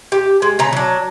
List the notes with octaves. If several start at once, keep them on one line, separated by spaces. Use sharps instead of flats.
G4
G#3
C#3 A#5
F#3 D4